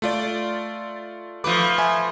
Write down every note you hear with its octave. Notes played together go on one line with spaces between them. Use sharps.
A3 F4 D5
F3 A3 B4 D6
E5 G#5